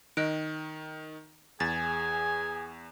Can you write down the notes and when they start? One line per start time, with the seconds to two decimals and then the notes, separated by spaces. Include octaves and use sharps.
0.17 D#3 D#5 F#6 D7
1.60 E2 G#4 G#5 A6